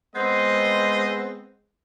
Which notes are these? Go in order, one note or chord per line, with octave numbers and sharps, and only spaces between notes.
G#3 B3 C4 C5 D#5